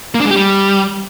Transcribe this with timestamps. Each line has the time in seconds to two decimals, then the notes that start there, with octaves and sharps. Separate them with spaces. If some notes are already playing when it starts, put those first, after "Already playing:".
0.15 A#3
0.20 D4
0.25 G#3
0.31 G4
0.36 G3